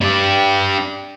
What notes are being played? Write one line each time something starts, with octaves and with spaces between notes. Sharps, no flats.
D4 G4